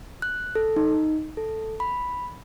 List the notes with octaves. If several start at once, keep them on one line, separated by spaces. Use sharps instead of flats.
F#6
A4
D#4
A4
B5